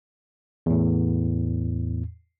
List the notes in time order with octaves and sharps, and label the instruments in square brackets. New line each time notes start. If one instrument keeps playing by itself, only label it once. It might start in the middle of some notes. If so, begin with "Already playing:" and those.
[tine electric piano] E2 A2